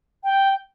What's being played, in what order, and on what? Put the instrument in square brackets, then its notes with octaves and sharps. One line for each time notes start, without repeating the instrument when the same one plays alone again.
[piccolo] G5